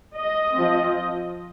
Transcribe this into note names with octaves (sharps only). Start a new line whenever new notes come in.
D#5
F3 C4